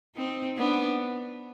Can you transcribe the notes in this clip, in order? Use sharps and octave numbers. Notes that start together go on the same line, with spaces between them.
C4 D#4
B3 D4